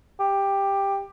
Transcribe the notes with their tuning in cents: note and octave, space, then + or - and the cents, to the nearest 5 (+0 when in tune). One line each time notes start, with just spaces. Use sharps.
G4 +10